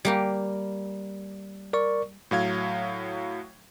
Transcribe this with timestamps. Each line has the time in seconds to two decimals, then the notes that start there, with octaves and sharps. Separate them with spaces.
0.05 G3 A#3 G4
1.73 A#4 D5 C#6
2.31 A2 F#3 F5 G#6